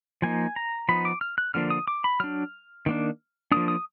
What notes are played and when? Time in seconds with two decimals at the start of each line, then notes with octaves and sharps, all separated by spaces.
0.22 F3 A#3 D#4 G#5
0.56 A#5
0.89 F3 B3 D#4 B5
1.05 D6
1.21 F6
1.38 F#6
1.54 D3 F3 A#3 D4 F6
1.70 D#6
1.88 D6
2.04 B5
2.20 F#3 D4 F6
2.86 D#3 A#3 D4
3.52 F3 A#3 D4 D#6
3.68 D#6